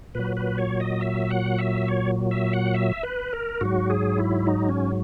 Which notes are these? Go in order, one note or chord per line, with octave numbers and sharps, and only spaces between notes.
A#2 F#3 B4
B4
C#5
D#5
E5
F#5
E5
C#5
E5
F#5
E5
B4
A#4
G#2 F#3 F#4
G#4
E4
D#4
C#4